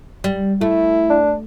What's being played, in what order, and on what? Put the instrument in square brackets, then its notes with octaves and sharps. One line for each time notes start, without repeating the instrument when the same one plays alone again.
[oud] G3
[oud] A3 [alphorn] E4
[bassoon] D4